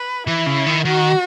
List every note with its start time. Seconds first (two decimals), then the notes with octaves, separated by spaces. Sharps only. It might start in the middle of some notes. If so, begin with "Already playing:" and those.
Already playing: B4
0.27 E3 E4
0.46 C#3
0.66 D#3
0.85 D#3 F#4